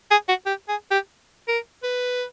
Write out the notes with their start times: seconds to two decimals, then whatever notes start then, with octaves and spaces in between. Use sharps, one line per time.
0.11 G#4
0.28 F#4
0.46 G4
0.68 G#4
0.91 G4
1.48 A#4
1.83 B4